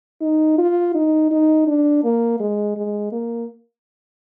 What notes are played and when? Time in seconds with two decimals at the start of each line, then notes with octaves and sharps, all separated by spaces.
0.21 D#4
0.58 F4
0.95 D#4
1.31 D#4
1.67 D4
2.04 A#3
2.40 G#3
2.77 G#3
3.12 A#3